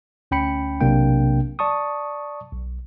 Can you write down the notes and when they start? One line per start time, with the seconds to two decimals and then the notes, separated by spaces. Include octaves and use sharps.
0.31 D2 C#4 G5 B5 C#7
0.81 B1 C3 A#3 D4 G5
1.59 D5 A5 C#6 D#6
2.53 B1